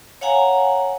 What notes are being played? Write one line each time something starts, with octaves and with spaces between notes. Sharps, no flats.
C#5 F5 F#5 G#5 A#5